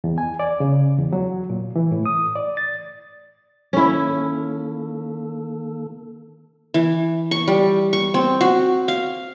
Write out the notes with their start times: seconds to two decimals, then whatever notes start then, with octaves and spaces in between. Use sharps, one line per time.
0.04 E2
0.18 G#5
0.39 D5
0.60 C#3
0.99 E2
1.13 F#3
1.50 A#2
1.76 E3
1.91 A2
2.06 D#6
2.35 D5
2.57 A6
3.73 D#3 A#3 C#4 E4 A4
6.74 E3
7.31 C#6
7.48 G3
7.93 C#6
8.14 C4
8.41 F#4
8.88 F5